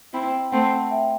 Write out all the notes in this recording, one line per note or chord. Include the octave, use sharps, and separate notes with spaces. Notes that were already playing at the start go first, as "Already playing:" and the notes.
C4 E4 G5 B5
A3 C4 F#5 A5
E5 G5